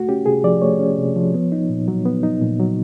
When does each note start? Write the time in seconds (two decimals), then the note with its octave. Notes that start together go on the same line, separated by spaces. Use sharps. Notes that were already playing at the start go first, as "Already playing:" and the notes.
Already playing: A3 F#4
0.09 C#4 G4
0.26 C3 G#4
0.44 F3 D5
0.62 A3 C#5
0.79 C#4
0.98 C3
1.16 F3
1.34 B3
1.52 D#4
1.70 A#2
1.88 F#3
2.05 B3
2.23 D#4
2.41 A#2
2.59 F#3